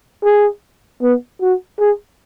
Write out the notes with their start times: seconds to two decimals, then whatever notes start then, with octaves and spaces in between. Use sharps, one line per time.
0.23 G#4
1.01 B3
1.41 F#4
1.80 G#4